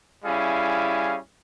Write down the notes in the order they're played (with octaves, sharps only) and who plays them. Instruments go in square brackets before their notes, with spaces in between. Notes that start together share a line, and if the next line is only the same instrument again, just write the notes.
[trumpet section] G3 C#4 E4 G#4 F5